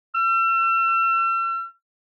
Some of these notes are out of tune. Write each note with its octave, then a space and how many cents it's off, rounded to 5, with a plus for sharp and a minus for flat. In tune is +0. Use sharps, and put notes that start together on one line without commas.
E6 +40